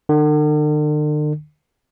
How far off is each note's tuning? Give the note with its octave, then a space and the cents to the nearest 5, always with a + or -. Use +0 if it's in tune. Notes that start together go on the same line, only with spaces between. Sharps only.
D3 +45